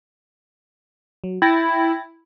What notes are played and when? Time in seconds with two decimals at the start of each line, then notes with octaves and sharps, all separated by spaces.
1.24 F#3
1.42 E4 G5 A6 A#6